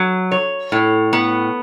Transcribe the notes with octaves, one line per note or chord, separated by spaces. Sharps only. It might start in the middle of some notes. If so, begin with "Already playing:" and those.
Already playing: F#3
C#5
A2
B3